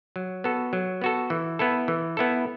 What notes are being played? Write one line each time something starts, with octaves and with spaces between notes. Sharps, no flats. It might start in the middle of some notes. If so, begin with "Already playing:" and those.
F#3
B3 F#4 A4
F#3
B3 F#4 A4
E3
B3 E4 A4
E3
B3 E4 A4